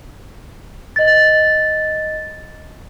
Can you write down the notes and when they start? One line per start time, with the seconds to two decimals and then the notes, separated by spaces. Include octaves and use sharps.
0.96 D#5 A6